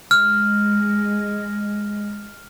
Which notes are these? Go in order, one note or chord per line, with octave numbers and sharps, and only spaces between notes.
G#3 F6